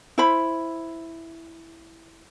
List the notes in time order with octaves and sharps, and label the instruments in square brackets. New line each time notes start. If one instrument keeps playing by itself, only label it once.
[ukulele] E4 C5 B5